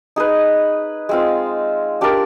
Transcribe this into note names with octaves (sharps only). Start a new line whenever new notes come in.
D#4 G#4 B4
G#3 C4 F4
D4 G4 A#4 D5